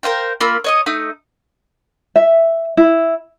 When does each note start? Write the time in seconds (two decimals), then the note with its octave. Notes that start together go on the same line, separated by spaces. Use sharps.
0.03 A#4 C5 F5 G5
0.41 A#3 F4 B5 E6
0.64 C#5 D#5 D#6
0.86 A3 D#4 D#6
2.16 E5
2.77 E4